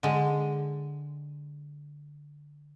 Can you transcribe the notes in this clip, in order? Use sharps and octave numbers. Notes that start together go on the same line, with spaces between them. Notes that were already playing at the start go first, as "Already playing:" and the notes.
D3 G#3